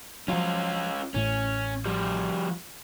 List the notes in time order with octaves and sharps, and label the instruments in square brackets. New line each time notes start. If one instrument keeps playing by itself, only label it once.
[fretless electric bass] F3 F#3 [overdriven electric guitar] C#4 F4
[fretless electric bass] A1 A2 A3 [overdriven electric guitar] C#4
[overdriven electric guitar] F3 G3